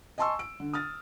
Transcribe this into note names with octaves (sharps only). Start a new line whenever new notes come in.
D#5 G#5 A5 C6 C#6 E6
D7
D3
D#6 F6 A6